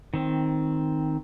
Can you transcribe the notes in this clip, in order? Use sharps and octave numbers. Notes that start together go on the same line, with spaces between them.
D#3 C4